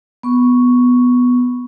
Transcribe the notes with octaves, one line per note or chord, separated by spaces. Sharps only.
B3 C#6